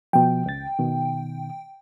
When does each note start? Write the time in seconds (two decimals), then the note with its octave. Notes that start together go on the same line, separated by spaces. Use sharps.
0.13 B2 F3 G5
0.46 C#2 A6
0.79 B2 D#3